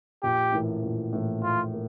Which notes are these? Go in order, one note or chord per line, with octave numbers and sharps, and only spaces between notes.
A#1 G4
A2 E3 A#3
A#1
A2 E3 A#3
A#1 F4
A#3